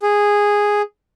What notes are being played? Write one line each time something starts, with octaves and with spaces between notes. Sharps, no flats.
G#4